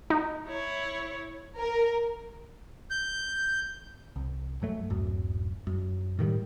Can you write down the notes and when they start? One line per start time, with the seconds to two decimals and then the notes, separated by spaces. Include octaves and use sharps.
0.10 D#4
0.48 E4 C#5
1.58 A#4
2.91 G6
4.16 C2
4.62 G2 F#3 A3
4.90 D1 F#2
5.67 F#2
6.19 A2 D#3 F3 G3